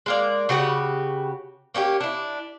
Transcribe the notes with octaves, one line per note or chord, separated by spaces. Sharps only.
G#3 A#3 D5
C#3 F#4 G4 B4
A#3 C#4 D4 G4
D4 E4